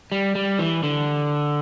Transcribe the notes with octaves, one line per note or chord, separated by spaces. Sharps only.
G3
G3
E3
D3